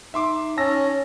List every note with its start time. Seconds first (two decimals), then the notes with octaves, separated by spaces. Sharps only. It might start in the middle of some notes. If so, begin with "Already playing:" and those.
0.14 D#4 E5 C6 D6
0.58 C#4 A5 E6 A#6